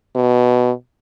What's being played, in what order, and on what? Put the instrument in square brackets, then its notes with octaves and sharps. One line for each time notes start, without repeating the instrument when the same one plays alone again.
[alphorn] B2